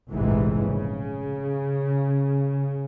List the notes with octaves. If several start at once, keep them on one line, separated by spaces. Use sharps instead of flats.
F1 A#1 G#2 C3 E3
C#3